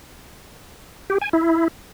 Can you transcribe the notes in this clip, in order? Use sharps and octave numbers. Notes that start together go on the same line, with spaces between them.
G4
G#5
E4